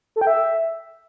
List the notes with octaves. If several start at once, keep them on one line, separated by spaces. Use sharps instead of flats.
A4
G5
E5